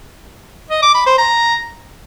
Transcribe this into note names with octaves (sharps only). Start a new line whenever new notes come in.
D#5
D6
B5
C5
A#5